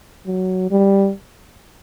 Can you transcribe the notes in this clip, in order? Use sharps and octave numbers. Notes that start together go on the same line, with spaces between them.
F#3
G3